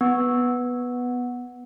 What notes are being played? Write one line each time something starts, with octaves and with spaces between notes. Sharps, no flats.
B3